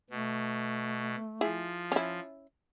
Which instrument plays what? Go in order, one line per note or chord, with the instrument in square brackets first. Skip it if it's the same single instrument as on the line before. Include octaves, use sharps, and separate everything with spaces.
[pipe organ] B2 [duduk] A3
[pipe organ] F3 [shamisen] E4 G#4
[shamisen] C#4 E4